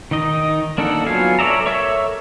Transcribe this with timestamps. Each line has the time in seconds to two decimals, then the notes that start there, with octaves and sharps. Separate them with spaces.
0.11 D#3 D#4 D#5
0.78 A#3 D4 D#4 A4 F#5
1.06 F#3 B3 F4 F5 G#5
1.39 A4 C#5 D5 E5 A#5
1.66 A4 A#4 C#5 E5 C#6